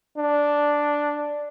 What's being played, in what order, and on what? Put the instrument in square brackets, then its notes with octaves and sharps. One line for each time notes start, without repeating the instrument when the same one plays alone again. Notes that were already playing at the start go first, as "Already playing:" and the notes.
[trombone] D4